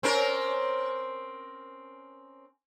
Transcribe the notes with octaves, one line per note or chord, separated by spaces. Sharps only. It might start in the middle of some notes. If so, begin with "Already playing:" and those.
C4 C#4 A#4